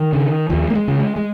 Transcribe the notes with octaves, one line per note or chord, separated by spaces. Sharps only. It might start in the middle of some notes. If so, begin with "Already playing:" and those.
Already playing: D#3
C#3
D#2 F3
A#3
G#3
C#3
G#3
G#3